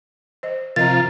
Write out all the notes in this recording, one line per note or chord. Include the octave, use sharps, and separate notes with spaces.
C5 D#5
C3 F3 F4 A#4 D#5 A#5 A6